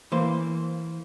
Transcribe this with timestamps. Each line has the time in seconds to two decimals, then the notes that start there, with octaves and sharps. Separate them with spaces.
0.12 E3 A#3 C5